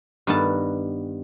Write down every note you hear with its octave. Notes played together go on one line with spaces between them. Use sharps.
G2 D#3 B3 A5